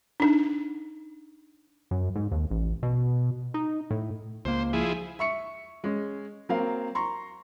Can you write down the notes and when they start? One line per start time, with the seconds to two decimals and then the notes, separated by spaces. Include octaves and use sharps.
0.20 D4 D#4
1.91 F#2
2.16 G#2
2.32 D#2
2.51 A1
2.83 B2
3.54 D#4
3.91 A2
4.45 C#2 A#3 C5
4.73 F3 E4 G#4
5.19 E5 C#6 C#7
5.84 G#3 C#4
6.49 F#3 A#3 C4 F5
6.95 A#5 C6 C#6